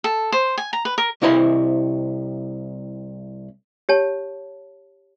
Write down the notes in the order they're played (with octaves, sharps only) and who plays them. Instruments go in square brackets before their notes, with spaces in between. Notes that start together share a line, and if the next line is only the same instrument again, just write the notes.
[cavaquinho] A4
C5
G#5
A#5
B4
A#4
[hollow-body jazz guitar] C2 C3 E4 C5 D#5 B5
[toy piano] G4 C#5 A5